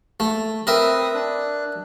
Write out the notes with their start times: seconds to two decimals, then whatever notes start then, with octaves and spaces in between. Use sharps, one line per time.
0.20 A3
0.67 C4 A#4 B4 E5 D#6
1.15 D4 F#6